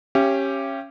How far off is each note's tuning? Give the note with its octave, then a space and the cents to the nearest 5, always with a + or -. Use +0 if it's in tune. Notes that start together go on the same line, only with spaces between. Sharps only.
C#4 -15 G4 +0 E5 +45